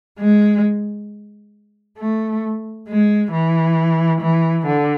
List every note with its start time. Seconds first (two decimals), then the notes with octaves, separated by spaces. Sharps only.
0.18 G#3
1.97 A3
2.87 G#3
3.32 E3
4.21 E3
4.65 D3